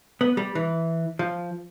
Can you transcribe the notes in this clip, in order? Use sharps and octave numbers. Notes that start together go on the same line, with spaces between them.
B3
G3
E3
F3